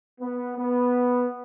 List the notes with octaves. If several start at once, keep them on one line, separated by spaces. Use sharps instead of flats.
B3
B3